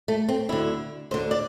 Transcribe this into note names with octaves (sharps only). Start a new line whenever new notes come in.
A3
C4
D2 D3 E4
D2 D3 C5
D5